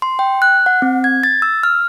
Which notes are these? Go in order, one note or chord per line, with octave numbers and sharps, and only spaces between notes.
C6
G5
F#6
F#5
C4
G#6
A6
E6
F6